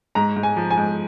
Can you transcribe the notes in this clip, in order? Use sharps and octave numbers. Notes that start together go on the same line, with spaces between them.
G#2 A#5
G#2
G#5
F3
G#5
G#2